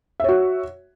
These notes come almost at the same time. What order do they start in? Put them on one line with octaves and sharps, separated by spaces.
E5 C#5 F#4